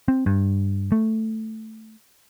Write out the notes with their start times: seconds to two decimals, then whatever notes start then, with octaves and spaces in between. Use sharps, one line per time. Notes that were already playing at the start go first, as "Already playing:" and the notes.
0.08 C4
0.26 G2
0.92 A3